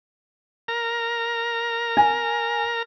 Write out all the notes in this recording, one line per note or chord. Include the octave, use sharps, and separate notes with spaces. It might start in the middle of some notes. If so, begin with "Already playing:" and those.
A#4 A#5
G#5